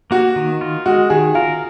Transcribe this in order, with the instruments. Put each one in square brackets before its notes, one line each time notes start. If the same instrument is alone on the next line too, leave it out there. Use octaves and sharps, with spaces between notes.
[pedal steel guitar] A#3 [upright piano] F#4
[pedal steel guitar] D#3
F4
[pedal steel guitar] G#3 [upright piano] F#4
[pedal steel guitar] D#3 [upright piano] G#4
[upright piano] F4 [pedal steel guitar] A#4